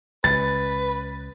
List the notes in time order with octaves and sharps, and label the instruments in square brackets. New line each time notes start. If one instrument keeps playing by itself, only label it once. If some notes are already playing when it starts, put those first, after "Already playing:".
[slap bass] C#2 [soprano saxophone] B4 [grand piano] A6